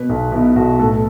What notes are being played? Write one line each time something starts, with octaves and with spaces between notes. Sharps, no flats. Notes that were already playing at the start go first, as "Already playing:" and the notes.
Already playing: B2 B4
B1 D#4
B2 E4
B1 F#4
A2 A4